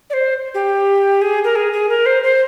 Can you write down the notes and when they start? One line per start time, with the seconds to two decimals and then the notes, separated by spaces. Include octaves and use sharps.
0.10 D5
0.13 C5
0.54 G4
1.22 G#4
1.44 A#4
1.56 G#4
1.73 G#4
1.89 A#4
2.06 C5
2.23 C5